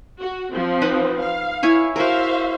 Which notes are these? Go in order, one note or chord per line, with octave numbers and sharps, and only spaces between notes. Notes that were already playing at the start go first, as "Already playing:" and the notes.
F#4
F3 C4
D#4 B4 F#5
F5
E4 C#5 G#5
F#4 A#4 C5 E5 F5